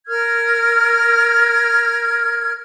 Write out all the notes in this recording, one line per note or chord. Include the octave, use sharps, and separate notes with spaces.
A#4 F6 G#6